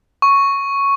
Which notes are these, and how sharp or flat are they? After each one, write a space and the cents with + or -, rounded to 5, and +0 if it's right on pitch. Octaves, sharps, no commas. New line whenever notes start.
C#6 +0